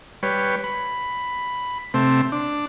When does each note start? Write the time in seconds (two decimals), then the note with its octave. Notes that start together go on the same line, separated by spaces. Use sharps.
0.23 G3 B4 C#5
0.64 B5
1.94 C3 A3 C4
2.32 D4